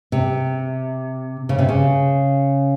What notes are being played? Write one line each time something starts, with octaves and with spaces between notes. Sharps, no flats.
C3
C#3
C3
C#3